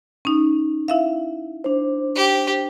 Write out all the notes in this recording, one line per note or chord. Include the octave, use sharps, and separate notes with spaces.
C#4 D#4
E4 E5 F5
D4 C5
G4